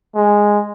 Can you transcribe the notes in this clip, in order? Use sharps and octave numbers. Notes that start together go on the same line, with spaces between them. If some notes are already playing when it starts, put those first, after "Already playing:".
G#3